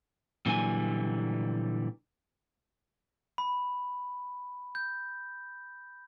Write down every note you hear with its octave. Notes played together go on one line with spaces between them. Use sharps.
A#2 D3 E3 F#3 G3 G#5
B5
G6